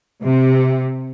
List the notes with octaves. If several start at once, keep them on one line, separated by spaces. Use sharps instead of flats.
C3